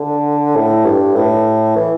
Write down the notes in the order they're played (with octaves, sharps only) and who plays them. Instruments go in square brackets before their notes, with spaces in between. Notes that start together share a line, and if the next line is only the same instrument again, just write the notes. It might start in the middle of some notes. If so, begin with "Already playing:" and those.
Already playing: [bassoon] D3
A2
G2
A2
E3